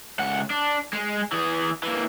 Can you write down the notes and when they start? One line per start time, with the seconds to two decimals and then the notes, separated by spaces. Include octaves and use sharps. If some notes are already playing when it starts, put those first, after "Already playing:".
0.19 C#2 F#5
0.50 D4
0.93 G#3
1.32 E3 G#4
1.83 E3 A#3